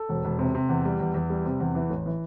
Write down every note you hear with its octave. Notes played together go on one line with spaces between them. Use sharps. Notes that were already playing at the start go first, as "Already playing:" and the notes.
Already playing: A4
E1
E1
C3
C3
E2
G3
E2
E2
G3
C3
E2
E3
A1
E3